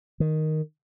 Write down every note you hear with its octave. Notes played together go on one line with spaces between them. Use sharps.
D#3